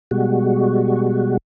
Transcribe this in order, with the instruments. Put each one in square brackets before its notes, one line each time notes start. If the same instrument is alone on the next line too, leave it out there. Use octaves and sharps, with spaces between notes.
[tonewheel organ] B2 G3 G#3 F#4